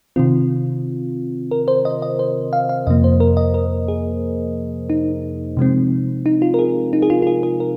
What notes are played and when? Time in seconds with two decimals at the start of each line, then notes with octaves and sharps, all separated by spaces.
0.16 C3 D#3 C4 F4
1.51 A#4
1.68 C5
1.85 D#5
2.02 D#5
2.19 C5
2.53 F5
2.69 F5
2.87 F2 C3 F3 A#3 D#5
3.04 C5
3.20 A#4
3.37 D#5
3.54 A#4
3.88 G#4
4.90 D#4
5.57 C3 F3 G#3 C4
6.26 D#4
6.42 F4
6.54 A#4
6.59 G#4
6.93 D#4
7.02 G#4
7.10 F4
7.22 F4
7.27 G#4
7.43 G#4
7.60 A#4